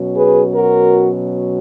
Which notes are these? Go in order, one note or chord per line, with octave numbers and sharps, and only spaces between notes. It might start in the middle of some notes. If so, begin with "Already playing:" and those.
Already playing: B2 F#3 C#4
G#4 B4
F#4 A#4